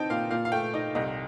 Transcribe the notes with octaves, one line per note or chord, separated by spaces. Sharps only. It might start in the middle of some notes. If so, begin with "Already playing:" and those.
Already playing: C4 D#4 G5 A5
A#2 F5
A#2 F5
F5
A3 G5
D#4 D#5
C2 D#5